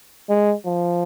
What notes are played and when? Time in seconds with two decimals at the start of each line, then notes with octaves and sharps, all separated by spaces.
0.29 G#3
0.65 F3